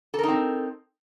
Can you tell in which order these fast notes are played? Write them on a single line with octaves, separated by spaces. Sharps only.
A4 A#4 D#4 C4